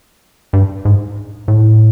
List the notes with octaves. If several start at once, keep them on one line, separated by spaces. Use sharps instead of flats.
G2
G#2
A2